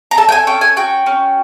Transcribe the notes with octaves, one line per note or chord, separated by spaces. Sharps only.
A#5
A4 A5
G5
G#5
C#4 G5
G#5
F#4 G5
C#4